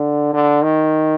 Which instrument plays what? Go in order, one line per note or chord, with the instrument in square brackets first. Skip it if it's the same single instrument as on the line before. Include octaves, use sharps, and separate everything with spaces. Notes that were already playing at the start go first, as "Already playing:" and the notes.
Already playing: [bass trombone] D3
D3
D#3